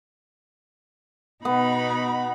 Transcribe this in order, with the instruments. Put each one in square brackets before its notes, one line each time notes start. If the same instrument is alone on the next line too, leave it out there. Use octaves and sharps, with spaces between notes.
[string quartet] B2 D#4 B5 [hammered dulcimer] B3